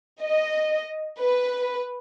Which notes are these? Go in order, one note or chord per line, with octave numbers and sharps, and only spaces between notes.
D#5
B4